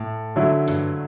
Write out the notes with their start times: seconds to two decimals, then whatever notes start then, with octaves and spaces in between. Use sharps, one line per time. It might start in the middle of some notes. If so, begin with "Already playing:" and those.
Already playing: A2
0.36 D3 F#3 A3 E4
0.67 G2